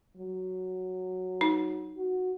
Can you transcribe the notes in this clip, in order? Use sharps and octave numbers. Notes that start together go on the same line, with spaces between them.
F#3
D#4
F#4